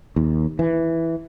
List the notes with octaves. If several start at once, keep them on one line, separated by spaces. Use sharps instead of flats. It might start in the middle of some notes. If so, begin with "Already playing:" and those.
D#2
E3